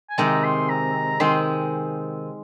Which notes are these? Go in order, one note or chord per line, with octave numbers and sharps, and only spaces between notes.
G#5
C3 D#3 G#3 C4 A#5
C6
A#5
D#3 G#3 C4 C6